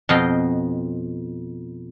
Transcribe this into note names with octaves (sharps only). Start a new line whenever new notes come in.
F2 B2 D#5 F5 G5